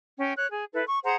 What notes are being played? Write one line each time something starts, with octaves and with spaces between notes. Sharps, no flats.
C#4 G5
C#5 F#6
G#4
E4 A4 B4
C#6
G#4 C5 F#5 A#5